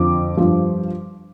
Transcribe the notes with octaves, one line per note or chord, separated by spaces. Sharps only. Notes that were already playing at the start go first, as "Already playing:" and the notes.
Already playing: F2 D3 F3 D6
G2 F3